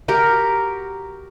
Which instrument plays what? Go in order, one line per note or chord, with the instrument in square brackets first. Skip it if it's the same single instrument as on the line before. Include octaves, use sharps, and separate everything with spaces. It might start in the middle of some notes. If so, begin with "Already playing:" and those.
[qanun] F#4 G4 A#4